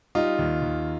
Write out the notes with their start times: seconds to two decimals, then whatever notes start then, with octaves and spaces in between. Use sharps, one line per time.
0.15 G3 D#4 F4
0.39 D#2
0.62 D#2